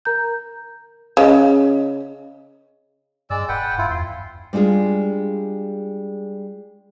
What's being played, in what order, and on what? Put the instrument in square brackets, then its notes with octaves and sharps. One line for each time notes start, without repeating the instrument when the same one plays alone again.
[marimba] A#4 A#5 G6
[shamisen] C#3 [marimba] C#4 D#5
[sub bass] G2 [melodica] G#3 D5 E6
[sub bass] D#1 [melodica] B4 F#5 G5
[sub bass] G2 [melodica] E4 F4
[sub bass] E2 [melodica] C6
[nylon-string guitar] G3 G#3 D4 F4 G#4